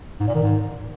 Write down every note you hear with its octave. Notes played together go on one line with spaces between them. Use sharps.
G#2
A#2
D#3
G#2